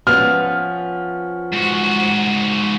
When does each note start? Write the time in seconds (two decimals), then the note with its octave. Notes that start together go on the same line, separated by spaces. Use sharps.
0.07 F3 B3 C#4 F6
1.53 G#2 F#4